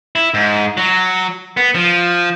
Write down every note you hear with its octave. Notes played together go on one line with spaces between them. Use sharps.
E4
G#2
F#3
B3
F3